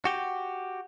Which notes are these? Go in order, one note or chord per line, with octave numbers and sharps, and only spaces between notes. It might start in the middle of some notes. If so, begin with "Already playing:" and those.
F#4 G4